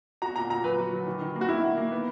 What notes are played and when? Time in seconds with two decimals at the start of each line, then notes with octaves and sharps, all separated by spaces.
0.22 F#4 A#5
0.36 A#2 A#5
0.50 A#2 A#5
0.64 F#3 B4
0.78 F#4
0.93 F#3
1.07 D#3
1.21 D#3
1.35 A#3
1.41 F#4
1.48 D#3 E4
1.63 D#3
1.77 A#3
1.92 B3